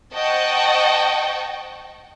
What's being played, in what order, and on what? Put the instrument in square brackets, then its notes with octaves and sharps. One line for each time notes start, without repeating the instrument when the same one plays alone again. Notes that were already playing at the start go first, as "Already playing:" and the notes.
[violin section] C5 D#5 F#5 G5 A5 C#6